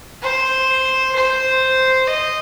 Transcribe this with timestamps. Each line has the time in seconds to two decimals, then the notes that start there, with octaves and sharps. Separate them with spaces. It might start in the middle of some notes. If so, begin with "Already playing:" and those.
0.22 C5
1.16 C5
2.08 D#5